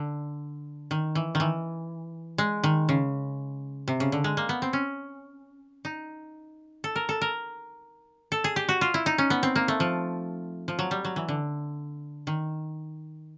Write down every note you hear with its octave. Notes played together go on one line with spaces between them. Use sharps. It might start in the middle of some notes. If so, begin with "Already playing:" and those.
Already playing: D3
D#3
E3
D#3
E3
G#3
D#3
C#3
C3
C#3
D3
G#3
A#3
B3
C4
C#4
D#4
A4
A#4
A4
A#4
A4
G#4
G4
F#4
F4
E4
D#4
C#4
B3
C4
A#3
A3
F3
F3
F#3
G3
F#3
E3
D3
D#3